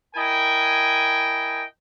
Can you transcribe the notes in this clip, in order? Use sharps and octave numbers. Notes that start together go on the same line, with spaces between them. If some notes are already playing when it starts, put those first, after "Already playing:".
E4 A#4 D#5 G5 G#5